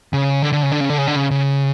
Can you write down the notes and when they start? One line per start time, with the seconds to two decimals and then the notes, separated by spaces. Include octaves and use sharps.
0.13 C#3
0.42 D3
0.53 D3
0.63 C#3
0.72 D3
0.81 C#3
0.90 D3
0.98 C#3
1.07 D3
1.16 C#3
1.31 C#3